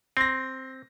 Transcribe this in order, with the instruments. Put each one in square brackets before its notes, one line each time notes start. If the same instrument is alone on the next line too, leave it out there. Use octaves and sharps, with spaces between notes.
[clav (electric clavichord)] C4 [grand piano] C6 A#6